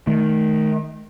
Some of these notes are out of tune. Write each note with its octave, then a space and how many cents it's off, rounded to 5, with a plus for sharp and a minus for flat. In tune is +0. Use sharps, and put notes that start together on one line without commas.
D#3 +0 A3 -30